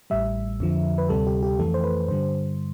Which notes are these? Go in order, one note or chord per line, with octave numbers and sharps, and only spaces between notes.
A1 A2 G3 E5
F2 D3 F3
B4
D2 C3 G3 A4
G4
G4
F2 E3 A3 A4
C5
B4
G2 D3 G3 C5